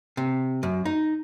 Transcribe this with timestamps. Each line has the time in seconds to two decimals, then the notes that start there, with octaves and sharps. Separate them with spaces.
0.17 C3
0.63 F#2
0.85 D#4